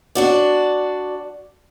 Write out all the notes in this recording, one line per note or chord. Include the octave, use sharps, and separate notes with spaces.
D4 F#4 D5